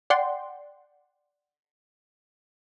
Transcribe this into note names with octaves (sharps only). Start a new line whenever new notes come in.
D5 F#5 G5 C6